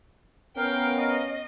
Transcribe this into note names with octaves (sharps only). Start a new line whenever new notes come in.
B3 C#4 A#4 F5 G5
D#5